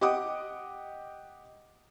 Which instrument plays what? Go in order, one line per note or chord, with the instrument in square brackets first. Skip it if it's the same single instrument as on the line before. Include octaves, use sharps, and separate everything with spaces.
[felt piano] G4 D#5 F#5 D6 D#6